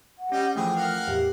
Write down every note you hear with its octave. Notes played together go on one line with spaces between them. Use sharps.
F#5
G3 C#4 G4 D#5
E3 F3 A3 G#4 G5
A#4 F5 F#5
E2 A2 G4